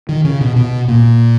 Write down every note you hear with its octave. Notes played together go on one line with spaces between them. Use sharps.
D#3
C#3
B2
B2
A#2